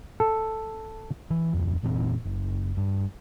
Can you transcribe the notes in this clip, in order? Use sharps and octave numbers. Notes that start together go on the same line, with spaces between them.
A4
E3
D1 F2
F1 A#2 E3 C4
F#1
G2